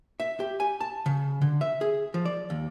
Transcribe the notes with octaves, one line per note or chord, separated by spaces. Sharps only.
E5
G4
G#5
A5
C#3
D3
E5
G#4
F3
D5
D#2